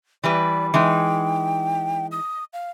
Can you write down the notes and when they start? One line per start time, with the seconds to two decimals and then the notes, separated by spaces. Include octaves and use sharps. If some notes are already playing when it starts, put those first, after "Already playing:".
0.24 E3 G3 B4 D5
0.74 E3 G#3 D#4 G5
2.12 D#6
2.53 F5